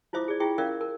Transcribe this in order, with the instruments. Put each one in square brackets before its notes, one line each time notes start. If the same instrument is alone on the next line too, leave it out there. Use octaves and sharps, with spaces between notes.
[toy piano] E4 F4 C5 E5 D6 D#6
G#4 D5
E4 F4 G#4 E5 G5 C#6
C#4 A#4 D5 E5 F5
A#4